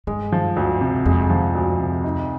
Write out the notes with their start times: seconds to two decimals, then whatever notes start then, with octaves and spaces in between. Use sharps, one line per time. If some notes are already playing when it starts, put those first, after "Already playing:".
0.07 G2 G#3
0.32 F3
0.56 D2
0.81 C3
1.06 F2 G#3
1.30 F3
1.55 D2
1.79 C3
2.04 D#4